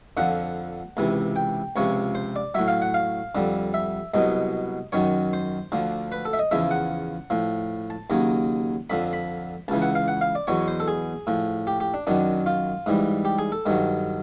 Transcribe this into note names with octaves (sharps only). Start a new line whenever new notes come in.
F2 D3 F3 F#5
C#2 C3 E3
G5
C#2 C3 F3 C#5
C5
D5
A2 F#3 E5
F5
F#5
F5
F2 D3 G3
E5
C2 B2 F#3 D#5
F#2 D#3 F#3 C#5
C5
D2 D3 F3
B4
A4
E5
D#5
E2 C#3 F3 E5
F#5
A2 F3
A5
D#2 C#3 F#3 A#5
F2 D3 F3 B5
B5
C#2 C#3 E3 A5
F#5
F5
F#5
F5
D5
E2 B2 F#3 C#5
C5
A4
G#4
A2 F3
G4
G4
D4
F#2 D#3 F#3 D4
F4
G#2 E3 G3
G4
G#4
A4
G2 D#3 F#3